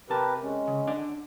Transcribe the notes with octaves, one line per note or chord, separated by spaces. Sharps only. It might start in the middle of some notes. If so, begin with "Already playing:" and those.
C3 G4 A#4 B4 A5
G#3 C#4
C#3
D4 D5 F#5